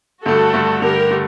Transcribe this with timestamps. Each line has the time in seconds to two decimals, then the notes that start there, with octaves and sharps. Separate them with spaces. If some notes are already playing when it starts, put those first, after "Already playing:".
0.25 G2 D3 A3 F#4 A4
0.53 G2 D3 A3
0.82 G2 D3 A3 G4 A#4
1.11 D3 A3